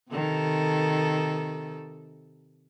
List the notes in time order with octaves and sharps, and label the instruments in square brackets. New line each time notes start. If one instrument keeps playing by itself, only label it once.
[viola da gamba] C3 D#3 A4